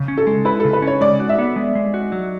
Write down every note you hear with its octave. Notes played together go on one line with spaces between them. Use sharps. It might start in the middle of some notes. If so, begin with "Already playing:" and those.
Already playing: C#3
C#4
A4
G#3
E4 B4
A4
C#3
B4
C#4 C#5
G#3 D5
F#4
E5
B3
G#3
G#3
F#4
F#3